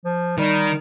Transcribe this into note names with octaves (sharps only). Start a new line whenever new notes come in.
F3
D#3 G3